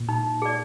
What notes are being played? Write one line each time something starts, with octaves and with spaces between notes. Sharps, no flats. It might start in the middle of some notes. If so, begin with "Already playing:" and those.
Already playing: A#2
D#4
G#4 D5